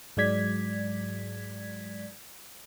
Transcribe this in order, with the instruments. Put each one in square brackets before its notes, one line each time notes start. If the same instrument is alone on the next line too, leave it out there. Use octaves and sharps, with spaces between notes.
[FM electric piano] G#2 F#3 G#3 D5 G#6 B6